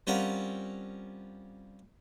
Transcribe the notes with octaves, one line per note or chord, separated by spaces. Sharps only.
G3 C4 C#4 F4 A#4 F#5